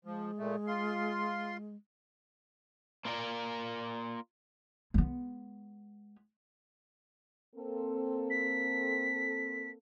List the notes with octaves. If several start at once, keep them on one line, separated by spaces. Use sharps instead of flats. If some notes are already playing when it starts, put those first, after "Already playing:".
F3 G#3
A#2 A3
F4 C6
A#3 F4 A#4 D5
G#3 B3
A#3 C4 A4
B6